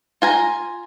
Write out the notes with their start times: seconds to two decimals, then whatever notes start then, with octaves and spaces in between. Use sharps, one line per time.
0.22 F4 G#5 A#5